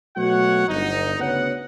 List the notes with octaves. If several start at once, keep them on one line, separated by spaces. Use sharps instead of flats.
B2 F#3 A3 F#4 C#5 F#5
G1 D#4
D2 C#3 B3 C#5 F#5